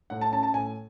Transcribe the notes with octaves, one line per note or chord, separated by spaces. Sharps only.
A2 F#5
A5
C#4 A5
A5
A2 G#5